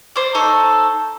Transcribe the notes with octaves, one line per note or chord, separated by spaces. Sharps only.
C5 D5
D#4 A4 C5 C#5